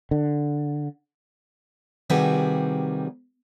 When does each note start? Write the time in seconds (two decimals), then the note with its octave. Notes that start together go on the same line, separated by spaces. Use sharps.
0.11 D3
2.10 C3 D#3 G3 F#4 G#4 B4